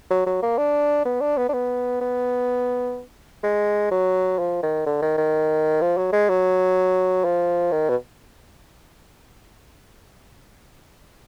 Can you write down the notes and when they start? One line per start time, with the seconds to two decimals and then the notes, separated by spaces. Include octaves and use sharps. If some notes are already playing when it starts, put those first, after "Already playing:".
0.10 F#3
0.26 F#3
0.42 A#3
0.58 D4
1.05 B3
1.21 D4
1.37 B3
1.49 D4
1.53 B3
2.01 B3
3.43 G#3
3.91 F#3
4.39 F3
4.63 D#3
4.86 D3
5.02 D#3
5.18 D#3
5.81 F3
5.97 F#3
6.13 G#3
6.29 F#3
7.24 F3
7.72 D#3
7.89 B2